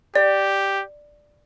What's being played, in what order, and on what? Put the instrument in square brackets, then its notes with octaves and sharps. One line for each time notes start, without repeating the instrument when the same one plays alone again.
[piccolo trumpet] G4 [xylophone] D5